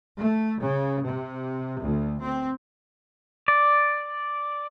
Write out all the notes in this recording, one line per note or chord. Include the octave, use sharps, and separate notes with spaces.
A3
C#3
C3
D2
C4
D5